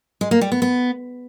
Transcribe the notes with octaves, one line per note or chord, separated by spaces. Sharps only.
G#3
A#3
G3
B3
B3